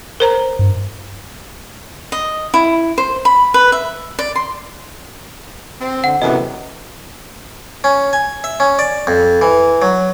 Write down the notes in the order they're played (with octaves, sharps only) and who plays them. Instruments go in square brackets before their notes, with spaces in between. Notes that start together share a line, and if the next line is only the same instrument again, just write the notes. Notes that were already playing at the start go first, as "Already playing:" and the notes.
[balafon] A#4 C5 A#5
[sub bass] G2
[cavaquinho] D#5
E4
C5
B5
B4
E5
D5
C6
[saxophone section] C4
[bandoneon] D3 [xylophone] F#5
[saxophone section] F#2 A2 [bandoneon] C3 E3 B3 [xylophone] D#5
[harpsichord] C#4
G#5
E5
C#4
D5
F2
E3
F#3